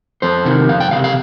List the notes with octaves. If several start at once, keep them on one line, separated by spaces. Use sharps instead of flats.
F2 C5
C3 D#3
F2 F5
G5
D#3 F5
C3
F5